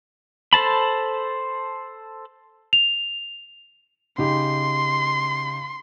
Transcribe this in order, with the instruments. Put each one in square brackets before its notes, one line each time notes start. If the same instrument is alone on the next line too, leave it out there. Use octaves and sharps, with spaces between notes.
[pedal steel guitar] A4 C5 A5 B5
[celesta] F7
[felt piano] C#3 D#4 G4 [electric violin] C6